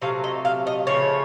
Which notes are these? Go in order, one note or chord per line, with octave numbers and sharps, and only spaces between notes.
C3 F#3 A3 F5
D#5
F5
D#5
C#3 F3 A3 C#5